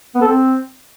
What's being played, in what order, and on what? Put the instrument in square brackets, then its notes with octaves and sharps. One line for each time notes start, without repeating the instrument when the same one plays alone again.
[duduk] B3
A4
C4